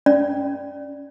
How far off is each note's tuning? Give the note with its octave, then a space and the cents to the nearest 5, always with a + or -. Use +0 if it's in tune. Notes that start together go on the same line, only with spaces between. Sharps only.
C#4 +0 D5 +0